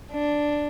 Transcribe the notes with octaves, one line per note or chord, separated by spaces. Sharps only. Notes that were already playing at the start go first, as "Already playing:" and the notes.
D4